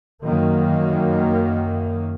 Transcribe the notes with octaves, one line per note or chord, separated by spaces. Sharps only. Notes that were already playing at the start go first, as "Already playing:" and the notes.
F#2 D#3 F#3 A#3